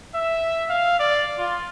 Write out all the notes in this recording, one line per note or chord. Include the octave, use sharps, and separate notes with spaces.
E5
F5
D5
F4